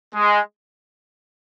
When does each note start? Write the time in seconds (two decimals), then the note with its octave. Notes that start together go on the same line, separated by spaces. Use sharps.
0.14 G#3